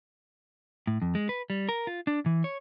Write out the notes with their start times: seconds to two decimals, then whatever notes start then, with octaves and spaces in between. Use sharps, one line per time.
0.87 A2
1.02 F2
1.15 G#3
1.29 B4
1.50 G3
1.69 A#4
1.87 F4
2.07 D4
2.26 E3
2.44 C#5